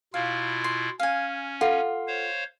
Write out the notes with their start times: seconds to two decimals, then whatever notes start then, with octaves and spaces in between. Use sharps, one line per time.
0.14 B2 E4 F4 F5
0.64 C6
1.00 C#4 F5 G#5
1.61 F4 A4 F#5
2.08 C5 C#5 F5